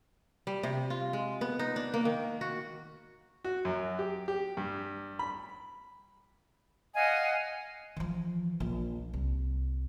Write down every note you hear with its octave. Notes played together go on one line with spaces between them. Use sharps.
G3
C3
F4
G#3
B3
D#4
D4
A#3
D#3
F#4
F#4
F#2
G4
G4
G2
B5
D#5 F5 F#5 G#5
E3 F3
A#1
C2